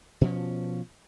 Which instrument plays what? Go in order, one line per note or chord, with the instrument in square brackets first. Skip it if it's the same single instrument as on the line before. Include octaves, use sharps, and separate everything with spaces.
[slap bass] B2 F3 C#4